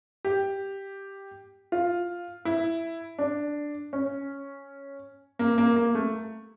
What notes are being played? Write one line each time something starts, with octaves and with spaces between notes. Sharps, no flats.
G4
F4
E4
D4
C#4
A#3
A#3
A#3
A3